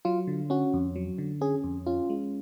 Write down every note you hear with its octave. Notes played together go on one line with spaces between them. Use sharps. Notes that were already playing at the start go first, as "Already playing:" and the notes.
F#3 F4
D3
C#4 F#4
F2
F#3
D3
C#4 G#4
F2
C#4 F4
G#3